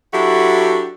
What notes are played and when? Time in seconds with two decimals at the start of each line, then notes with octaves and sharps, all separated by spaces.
0.13 F#3 D4 E4 F#4 G4 A4